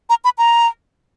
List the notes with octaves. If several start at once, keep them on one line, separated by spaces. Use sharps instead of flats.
A#5
B5
A#5